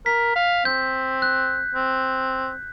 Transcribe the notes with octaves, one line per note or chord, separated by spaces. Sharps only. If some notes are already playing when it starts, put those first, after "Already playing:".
A#4 B6
F5
C4 G6
F#6
C4